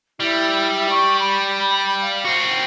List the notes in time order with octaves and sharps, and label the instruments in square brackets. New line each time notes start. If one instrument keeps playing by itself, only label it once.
[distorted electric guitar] G3 [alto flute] E4
[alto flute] C#6
B5
F5
[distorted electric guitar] C4 F#4